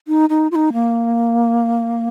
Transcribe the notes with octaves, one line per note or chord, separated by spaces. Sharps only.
D#4
D#4
F4
D#4
A#3